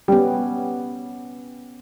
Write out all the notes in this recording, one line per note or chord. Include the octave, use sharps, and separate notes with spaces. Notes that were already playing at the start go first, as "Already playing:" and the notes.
G3 B3 C#4